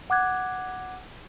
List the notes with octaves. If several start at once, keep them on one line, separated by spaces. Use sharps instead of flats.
F#5 D6 F#6 G#6